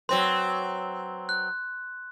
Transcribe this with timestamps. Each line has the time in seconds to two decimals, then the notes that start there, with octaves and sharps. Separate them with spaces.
0.09 F#3 C4 B4 C6
1.29 F#6